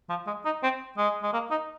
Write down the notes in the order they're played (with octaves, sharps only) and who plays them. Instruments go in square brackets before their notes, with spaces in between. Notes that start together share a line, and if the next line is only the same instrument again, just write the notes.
[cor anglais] F3
G#3
D#4
C4
G#3
G#3
A#3
D#4